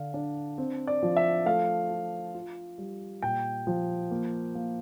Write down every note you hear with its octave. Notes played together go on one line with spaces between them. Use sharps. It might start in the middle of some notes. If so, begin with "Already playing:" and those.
Already playing: D3 F5
D4
C4
D5
F3
E5
A3 F5
F4
F4
G3
A#2 G5
F3
A#3
A#3